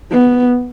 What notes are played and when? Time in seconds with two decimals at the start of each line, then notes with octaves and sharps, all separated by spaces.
0.11 B3